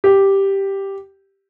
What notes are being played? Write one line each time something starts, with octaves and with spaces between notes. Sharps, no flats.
G4